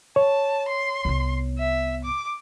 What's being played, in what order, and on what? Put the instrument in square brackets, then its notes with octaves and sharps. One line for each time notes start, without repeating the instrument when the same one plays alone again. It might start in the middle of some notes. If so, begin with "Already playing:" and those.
[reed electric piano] C#5 [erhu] A5
[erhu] C6
[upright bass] C2 B3
[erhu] E5
D6